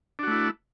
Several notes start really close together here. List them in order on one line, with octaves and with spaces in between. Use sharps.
D4 F#4 A3 E4